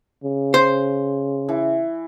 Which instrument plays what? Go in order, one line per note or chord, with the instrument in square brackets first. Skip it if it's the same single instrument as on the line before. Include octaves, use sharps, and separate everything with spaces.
[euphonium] C#3
[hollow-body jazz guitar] C5
[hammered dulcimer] E3